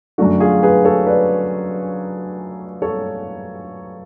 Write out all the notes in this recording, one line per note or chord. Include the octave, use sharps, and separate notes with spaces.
F#2 D3 F#3 A3 D4 F#4
F4 G#4
G#4 B4
A4 C#5
B4 D5
A4 C#5